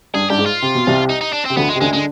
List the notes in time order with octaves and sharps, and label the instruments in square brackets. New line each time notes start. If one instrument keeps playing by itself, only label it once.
[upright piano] G2 [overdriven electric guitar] G#4
[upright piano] G2 [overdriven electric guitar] G4
[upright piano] G#2
[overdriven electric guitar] F4
[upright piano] C3
B2
C2 C3
[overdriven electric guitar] D#4
D#4
D4
[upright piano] C3 [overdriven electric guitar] C4
[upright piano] D2 D3 [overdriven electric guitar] B3
[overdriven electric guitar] G#3
[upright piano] C3
[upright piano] D2 D3 [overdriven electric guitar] G#3
[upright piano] D3 [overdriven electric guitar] G#3